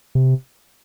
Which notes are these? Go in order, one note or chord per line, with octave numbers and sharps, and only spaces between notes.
C3